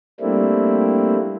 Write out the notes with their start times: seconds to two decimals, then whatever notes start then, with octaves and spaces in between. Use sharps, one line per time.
0.21 G3 A3 A#3 C4 D4 E4